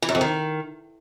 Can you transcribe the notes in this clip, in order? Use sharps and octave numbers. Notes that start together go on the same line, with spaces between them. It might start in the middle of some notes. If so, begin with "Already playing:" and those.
E3
F#2
F2
D#3